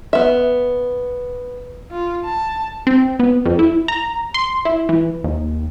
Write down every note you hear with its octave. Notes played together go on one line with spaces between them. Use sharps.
B3 E5
F4
A5
C4
B3
F2
E4
A#5
C6
E4
E3
D#2